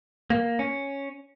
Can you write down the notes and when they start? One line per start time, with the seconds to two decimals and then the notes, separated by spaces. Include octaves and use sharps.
0.30 A#3
0.59 C#4